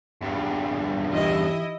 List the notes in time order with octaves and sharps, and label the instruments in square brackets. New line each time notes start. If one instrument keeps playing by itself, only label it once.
[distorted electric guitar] E2 G2
[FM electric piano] E3 D#4 G4 [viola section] E4 D#5